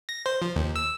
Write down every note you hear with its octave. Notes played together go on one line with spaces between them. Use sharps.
A#6
C5
F3
D#2
E6